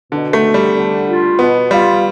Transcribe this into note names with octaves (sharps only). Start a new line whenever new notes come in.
B2 D3
A3
B3
G3
D3
F4
B2 B3
G3 F4